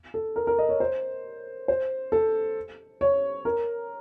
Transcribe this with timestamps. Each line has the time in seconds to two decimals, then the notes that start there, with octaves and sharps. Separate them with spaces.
0.14 A4
0.36 A#4
0.47 A#4
0.59 D#5
0.69 C#5
0.80 C5
1.68 C5
2.12 A4
3.01 C#5
3.45 A#4